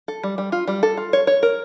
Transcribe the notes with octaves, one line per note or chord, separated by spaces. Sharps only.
A4
G3
G3
F4
G3
A4
F4
C#5
C#5
A#4